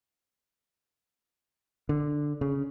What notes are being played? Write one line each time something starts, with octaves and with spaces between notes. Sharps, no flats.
D3
C#3